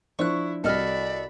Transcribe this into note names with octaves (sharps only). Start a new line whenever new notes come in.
F3 D4 E4 C5 C#6 F#6
C2 F#4 A4 D5 D#5 B5 F6